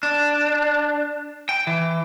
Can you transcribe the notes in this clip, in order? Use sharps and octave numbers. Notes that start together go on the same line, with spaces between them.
D4
G5
E3